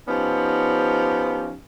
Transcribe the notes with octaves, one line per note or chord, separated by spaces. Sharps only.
F3 B3 C#4 D#4 G4